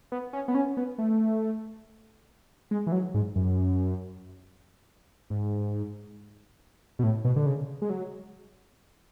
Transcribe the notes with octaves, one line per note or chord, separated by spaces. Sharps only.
B3
C#4
B3
C#4
B3
A3
G#3
E3
F#3
G#2
F#2
G#2
B2
A2
B2
D3
C#3
G#3
F#3